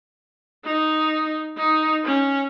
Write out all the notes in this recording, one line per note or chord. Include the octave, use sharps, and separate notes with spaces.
D#4
D#4
C#4